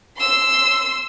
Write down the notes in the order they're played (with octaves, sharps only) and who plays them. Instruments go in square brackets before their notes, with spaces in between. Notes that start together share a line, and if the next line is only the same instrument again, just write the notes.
[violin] C6 E6